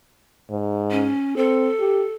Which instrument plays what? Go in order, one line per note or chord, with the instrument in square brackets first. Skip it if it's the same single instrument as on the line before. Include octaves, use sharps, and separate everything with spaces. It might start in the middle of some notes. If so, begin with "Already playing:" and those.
[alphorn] G#2
[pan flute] C#4
[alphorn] C4 [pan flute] A4
[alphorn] G4